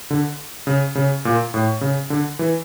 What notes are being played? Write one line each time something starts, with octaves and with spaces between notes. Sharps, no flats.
D3
C#3
C#3
A#2
A2
C#3
D3
E3